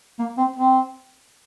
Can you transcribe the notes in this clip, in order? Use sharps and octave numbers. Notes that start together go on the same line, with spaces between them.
A#3
C4
C4